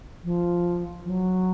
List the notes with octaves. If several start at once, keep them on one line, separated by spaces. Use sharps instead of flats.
F3
F3
F#3